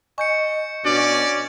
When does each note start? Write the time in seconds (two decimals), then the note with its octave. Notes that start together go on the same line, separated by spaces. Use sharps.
0.18 D#5 G#5 C#6 G6 C#7
0.85 B2 C#4 D4 F#4 D5